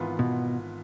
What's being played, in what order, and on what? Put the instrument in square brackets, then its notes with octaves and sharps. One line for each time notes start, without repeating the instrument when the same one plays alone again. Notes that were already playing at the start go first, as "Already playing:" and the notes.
Already playing: [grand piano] G#1 G#2 E3 B3 F4
[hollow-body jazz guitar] B2